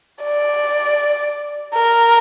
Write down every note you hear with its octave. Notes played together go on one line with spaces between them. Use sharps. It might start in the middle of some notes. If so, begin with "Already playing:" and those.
D5
A#4